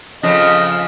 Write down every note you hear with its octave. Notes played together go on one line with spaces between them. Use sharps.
F2 C#3 F3 D#5